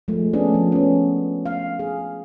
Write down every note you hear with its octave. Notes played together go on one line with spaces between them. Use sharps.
F3 G#3 A3
A3 B3 C#4 D4 G#4
F3
B3 C#4
F5
G#4